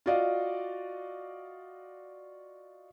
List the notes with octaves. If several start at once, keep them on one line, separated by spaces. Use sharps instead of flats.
F4 F#4 D5 D#5 F5